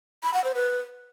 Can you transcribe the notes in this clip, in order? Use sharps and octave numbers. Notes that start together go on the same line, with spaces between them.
B5
F#5
C5
B4